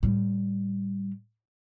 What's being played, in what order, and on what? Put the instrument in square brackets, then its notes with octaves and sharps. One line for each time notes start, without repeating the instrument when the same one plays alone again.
[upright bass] A2 G3